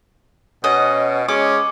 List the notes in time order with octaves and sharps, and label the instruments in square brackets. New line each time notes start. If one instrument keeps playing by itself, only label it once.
[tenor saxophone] B2 [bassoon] C#4 [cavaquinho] D#5 F#5
[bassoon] G#3 [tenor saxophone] C#4 [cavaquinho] D6